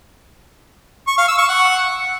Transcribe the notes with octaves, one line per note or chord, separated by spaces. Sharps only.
C#6
F5
E6
C#6
F#5